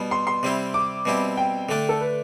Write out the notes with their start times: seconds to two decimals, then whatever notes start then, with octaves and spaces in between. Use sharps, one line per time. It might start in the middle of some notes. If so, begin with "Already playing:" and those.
Already playing: B2 G3 B3
0.11 C6
0.27 C6
0.43 C3 G3 C4 E4
0.74 D6
1.05 B2 G3 C4 E4
1.37 G5
1.69 D3 A3 D4
1.89 A4
2.01 B4